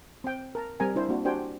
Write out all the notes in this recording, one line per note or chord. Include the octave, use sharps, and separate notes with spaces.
C4 G5
A#4 A5 A#5
G3 C4 A#4 G#5 A#5
D4 E4 C5
A#3 C4 D4 F#4
D4 F#4 G4 C5 G5 G#5